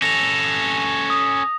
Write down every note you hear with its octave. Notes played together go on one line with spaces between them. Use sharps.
C#4 A4 A#6 F7
D#6